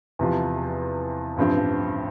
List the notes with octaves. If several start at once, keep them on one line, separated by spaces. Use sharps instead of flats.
E2 C3 F3
A1 G2 F3 C4